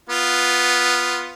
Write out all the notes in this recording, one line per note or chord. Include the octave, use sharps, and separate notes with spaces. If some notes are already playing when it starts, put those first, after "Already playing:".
B3 F4